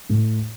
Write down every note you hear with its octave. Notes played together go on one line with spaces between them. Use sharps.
A2